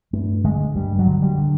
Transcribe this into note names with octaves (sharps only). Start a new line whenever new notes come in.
G2 A3
D3 G#3
G2 G3
F#3
D3
G3
D3